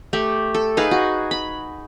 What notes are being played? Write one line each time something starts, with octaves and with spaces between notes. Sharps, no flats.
A3 G4
A4
D#4 G#4 B4 F5
F#4
B5